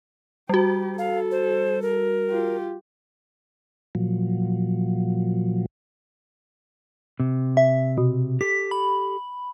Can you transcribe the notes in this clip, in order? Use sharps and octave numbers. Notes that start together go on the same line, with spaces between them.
G3 F#4 G4
A4 F5
C5
A#4
F4 G4
A#2 F3 F#3
C3
E5
B2
G4 A4 B6
B5